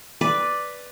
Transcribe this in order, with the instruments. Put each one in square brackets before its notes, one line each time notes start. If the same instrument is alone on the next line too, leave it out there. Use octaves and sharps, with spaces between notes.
[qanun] B4 D5